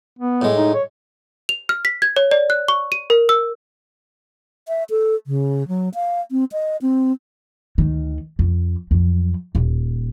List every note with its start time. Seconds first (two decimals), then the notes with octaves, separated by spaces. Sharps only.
0.19 B3
0.42 A2 G#3
0.57 D#4
0.74 C#5
1.49 F7
1.69 F6
1.85 B6
2.02 G#6
2.16 C#5
2.31 D5
2.50 F#6
2.68 C#6
2.92 D#7
3.10 A#4
3.29 E6
4.68 E5
4.90 A4
5.27 C#3
5.68 F#3
5.94 F5
6.31 C4
6.52 D#5
6.82 C4
7.78 D2 D#3
8.39 F2
8.91 F2 F#3
9.55 D#1